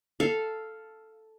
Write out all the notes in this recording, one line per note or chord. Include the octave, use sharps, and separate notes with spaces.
A4 F5